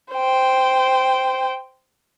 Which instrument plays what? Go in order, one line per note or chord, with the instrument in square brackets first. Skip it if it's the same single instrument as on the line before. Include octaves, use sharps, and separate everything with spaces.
[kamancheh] C5 G5